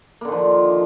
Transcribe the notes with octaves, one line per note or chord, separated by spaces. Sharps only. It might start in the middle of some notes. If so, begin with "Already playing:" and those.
D3 D#3 F3 A#3